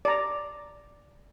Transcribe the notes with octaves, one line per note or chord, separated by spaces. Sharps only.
D5 A#5